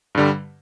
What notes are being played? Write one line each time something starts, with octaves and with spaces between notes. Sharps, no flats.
G2 D3 G3